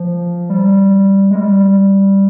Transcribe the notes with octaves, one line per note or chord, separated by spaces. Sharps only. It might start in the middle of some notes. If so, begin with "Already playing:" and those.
Already playing: F3
G3
G#3
G3